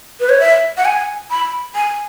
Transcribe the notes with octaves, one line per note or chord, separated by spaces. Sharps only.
B4
C#5
E5
F#5
G#5
B5
G#5